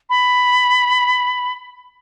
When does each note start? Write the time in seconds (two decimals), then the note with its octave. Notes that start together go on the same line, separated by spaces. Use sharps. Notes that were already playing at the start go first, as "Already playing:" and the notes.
0.10 B5